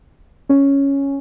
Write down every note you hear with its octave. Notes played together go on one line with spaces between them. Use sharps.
C#4